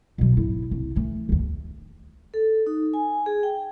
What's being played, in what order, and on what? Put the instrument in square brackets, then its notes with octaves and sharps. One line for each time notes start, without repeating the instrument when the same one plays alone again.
[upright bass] B2 F#3
G#1 E4
C2
E3 A3
G1 D#2
[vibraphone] A4
D#4
G#5
G#4
G5